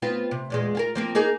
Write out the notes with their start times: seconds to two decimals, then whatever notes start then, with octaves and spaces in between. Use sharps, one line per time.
0.02 B3 C4 F4
0.31 C3
0.50 E2 A#2 G#3
0.75 F4 G#4 A#4
0.95 F3 A#3 C4
1.15 A#3 D#4 G#4